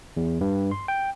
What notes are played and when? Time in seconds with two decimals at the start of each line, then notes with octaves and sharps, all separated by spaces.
0.17 E2
0.41 G2
0.71 C6
0.88 G5